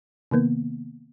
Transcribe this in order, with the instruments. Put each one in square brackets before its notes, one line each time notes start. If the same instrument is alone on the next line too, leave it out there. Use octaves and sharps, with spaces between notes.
[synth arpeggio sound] C3 D#3 A#3 B3